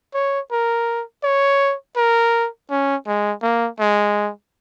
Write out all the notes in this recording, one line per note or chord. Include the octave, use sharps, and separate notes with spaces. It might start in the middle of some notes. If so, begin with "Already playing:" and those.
C#5
A#4
C#5
A#4
C#4
G#3
A#3
G#3